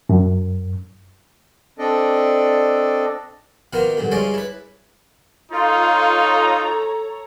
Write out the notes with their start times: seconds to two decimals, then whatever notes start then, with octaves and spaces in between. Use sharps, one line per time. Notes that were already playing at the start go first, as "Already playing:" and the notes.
0.09 F#2
1.79 C4 D4 A4 D5 D#5
3.73 B2 D#3 A#3 B3 F4 A#4
3.97 G2 A#2 D3
4.11 G2 G#3 C#4 F4 D5 D#5
4.34 E4 B4
5.51 D#4 F4 A4 C#5 A#5